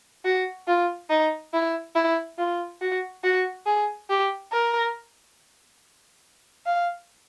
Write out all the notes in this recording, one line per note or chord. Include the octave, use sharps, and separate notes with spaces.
F#4
F4
D#4
E4
E4
F4
F#4
F#4
G#4
G4
A#4
F5